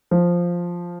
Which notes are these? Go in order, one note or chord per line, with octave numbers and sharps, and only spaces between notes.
F3